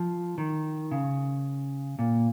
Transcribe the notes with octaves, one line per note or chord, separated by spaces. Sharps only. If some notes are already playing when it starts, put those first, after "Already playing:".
Already playing: F3
D#3
C#3
A#2